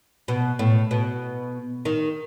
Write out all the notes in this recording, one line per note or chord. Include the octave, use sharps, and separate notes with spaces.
B2
A2
B2
D#3